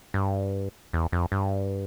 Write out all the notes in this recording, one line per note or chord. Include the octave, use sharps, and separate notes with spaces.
G2
E2
F2
G2